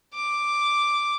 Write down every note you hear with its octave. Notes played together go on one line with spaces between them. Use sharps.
D6